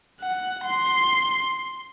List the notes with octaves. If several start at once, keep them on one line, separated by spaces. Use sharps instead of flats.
F#5
C6